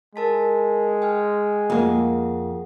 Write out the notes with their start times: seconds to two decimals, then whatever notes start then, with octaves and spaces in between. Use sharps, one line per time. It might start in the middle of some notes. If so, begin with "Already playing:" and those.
0.16 G#3 A#4 A5 B6
1.02 G5 G#5 F6
1.70 F2 A#3 G#4 F#5 D#6